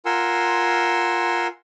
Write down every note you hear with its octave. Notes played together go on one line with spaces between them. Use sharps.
F4 A#4 F#5 G#5 C6 E6